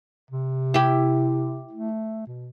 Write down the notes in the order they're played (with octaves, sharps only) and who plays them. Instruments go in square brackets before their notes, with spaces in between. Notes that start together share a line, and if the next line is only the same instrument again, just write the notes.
[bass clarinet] C3
[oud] E4 G4
[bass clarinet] A3
B2